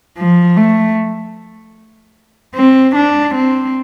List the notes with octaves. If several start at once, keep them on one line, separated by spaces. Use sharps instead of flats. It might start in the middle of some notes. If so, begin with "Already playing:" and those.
F3
A3
C4
D4
C4